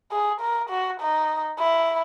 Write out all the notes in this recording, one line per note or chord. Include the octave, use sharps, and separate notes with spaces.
G#4
A#4
F#4
D#4
E4